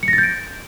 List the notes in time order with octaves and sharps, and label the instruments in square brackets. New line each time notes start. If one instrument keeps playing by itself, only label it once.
[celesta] C#7
A#6
A6
G6
D7